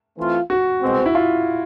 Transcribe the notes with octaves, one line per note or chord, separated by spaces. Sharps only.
E3 A3 C4 F4
F#4
C2 B2 G#3 C4
E4
F4